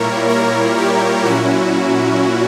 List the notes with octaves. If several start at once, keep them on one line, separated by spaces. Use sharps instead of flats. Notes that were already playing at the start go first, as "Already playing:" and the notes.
Already playing: A#2 G3 A#3 E4 A#4 C#5
A#4
G4
A#2 F#3 C#4 E4 F#4